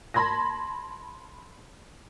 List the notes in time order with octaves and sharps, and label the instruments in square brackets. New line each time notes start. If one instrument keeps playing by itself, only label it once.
[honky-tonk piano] A5 B5 C6 G#6 A#6